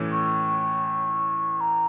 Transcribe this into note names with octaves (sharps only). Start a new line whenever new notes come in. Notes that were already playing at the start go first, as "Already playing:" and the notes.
Already playing: A2 E3 C#4
C#6
A#5